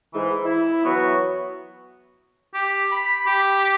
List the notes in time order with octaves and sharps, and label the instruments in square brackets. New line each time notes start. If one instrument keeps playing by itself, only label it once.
[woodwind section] G#2 E3
E4
E3 F#3 B3 F#4 C#6
[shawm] G4
B5
G4